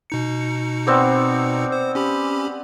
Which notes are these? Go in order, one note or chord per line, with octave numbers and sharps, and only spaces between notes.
B2 D#4 C#7
B3 C4 D5
C5
C#4 G4 B5